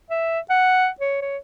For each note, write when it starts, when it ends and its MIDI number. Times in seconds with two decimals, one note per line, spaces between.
0.10 0.40 76
0.50 0.88 78
1.00 1.18 73
1.22 1.38 73